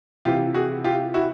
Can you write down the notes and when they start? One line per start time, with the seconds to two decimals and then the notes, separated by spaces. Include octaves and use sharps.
0.25 C3 E3 F4 G4
0.54 F#4 G#4
0.84 F4 G4
1.14 E4 F#4